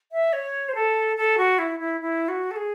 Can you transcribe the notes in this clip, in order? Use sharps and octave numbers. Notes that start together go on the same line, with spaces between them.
E5
C#5
C5
A4
A4
F#4
E4
E4
E4
F#4
A4
G#4